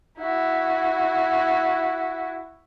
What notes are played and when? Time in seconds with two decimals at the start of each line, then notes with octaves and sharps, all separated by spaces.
0.18 E4 F#4